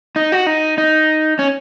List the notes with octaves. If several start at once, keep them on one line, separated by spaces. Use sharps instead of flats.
D#4
F#4
D#4
D#4
C#4